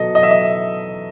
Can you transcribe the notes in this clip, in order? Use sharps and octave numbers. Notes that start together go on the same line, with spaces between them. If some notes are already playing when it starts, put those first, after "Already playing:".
Already playing: B2 F#3 A4 D#5
D#5
E5
D#5